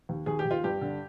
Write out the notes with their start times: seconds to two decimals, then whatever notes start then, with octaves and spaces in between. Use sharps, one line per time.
0.09 D#2
0.26 D#2 G#4
0.39 G4
0.45 D#2
0.51 F4
0.64 G2 G4
0.81 D3